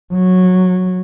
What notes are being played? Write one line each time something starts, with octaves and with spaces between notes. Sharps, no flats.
F#3